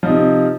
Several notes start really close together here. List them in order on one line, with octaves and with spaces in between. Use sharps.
F3 D#4 C3